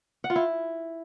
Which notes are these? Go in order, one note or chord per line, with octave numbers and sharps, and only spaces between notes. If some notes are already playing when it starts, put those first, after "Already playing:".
F#5
F4
E4